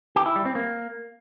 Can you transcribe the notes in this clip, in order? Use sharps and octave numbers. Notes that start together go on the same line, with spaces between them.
G4
E4
G3
C4
A#3